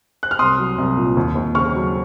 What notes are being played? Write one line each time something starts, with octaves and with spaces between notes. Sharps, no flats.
F#6
F6
C2 C6 D#6
F#3
C2
A#2
D#2
D#2
C#3 C#6 F6
F#3